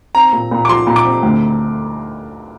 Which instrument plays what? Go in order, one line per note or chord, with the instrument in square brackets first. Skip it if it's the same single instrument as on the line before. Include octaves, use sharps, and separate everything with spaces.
[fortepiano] C4 [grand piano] A#5
[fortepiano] A#2
A#2
[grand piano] D6
[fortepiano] F3 [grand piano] C6
[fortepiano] A#2
[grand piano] D6
[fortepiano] C4
D2